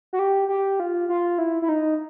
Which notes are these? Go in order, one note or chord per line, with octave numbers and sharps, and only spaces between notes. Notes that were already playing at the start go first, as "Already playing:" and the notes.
F#4
G4
G4
F4
F4
E4
E4
D#4